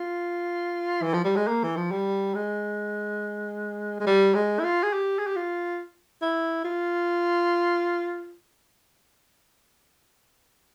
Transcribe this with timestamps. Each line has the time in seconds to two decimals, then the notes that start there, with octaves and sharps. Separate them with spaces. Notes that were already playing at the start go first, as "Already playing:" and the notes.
Already playing: F4
1.02 E3
1.13 F3
1.24 G3
1.36 G#3
1.47 A#3
1.63 E3
1.77 F3
1.91 G3
2.35 G#3
4.00 G#3
4.06 G3
4.35 G#3
4.59 E4
4.64 F4
4.83 G#4
4.93 G4
5.19 G#4
5.27 G4
5.36 F4
6.22 E4
6.64 F4